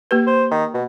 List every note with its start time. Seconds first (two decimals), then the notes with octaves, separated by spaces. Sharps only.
0.11 A#3 G4 B4
0.27 C5
0.51 D#3
0.74 B2